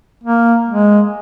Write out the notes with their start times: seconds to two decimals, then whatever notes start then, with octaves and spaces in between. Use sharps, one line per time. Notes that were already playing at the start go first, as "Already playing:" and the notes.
0.24 A#3
0.69 G#3